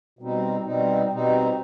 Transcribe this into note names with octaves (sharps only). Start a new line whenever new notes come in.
B2 G3 C4 D#4
B2 G3 C4 D#4
B2 G3 C4 D#4